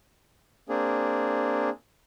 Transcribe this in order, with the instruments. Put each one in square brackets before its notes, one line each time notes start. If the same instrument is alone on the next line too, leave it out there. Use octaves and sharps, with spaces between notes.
[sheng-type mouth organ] A#3 C4 D4 G#4